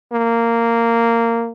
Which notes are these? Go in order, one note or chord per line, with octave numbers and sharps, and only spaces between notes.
A#3